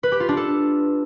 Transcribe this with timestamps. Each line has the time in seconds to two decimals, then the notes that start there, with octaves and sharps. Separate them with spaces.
0.03 B4
0.12 G4
0.20 F4
0.29 D4
0.37 A4